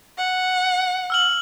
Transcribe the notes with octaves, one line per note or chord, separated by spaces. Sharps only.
F#5
E6 F6 F#7